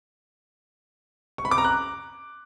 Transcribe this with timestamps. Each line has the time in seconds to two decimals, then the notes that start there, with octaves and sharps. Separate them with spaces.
1.38 C#6
1.45 B5
1.51 D6
1.58 A#5
1.64 F#6